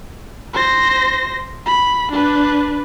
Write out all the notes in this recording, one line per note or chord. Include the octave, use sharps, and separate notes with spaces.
C5 A#6
B5
D4 B4